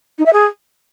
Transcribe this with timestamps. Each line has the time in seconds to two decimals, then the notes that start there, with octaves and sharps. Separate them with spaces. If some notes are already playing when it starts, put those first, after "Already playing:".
0.18 D#4
0.26 E5
0.33 G#4